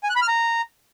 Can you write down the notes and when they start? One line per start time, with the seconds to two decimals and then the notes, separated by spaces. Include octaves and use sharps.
0.03 G#5
0.10 F#6
0.16 B5
0.22 F6
0.28 A#5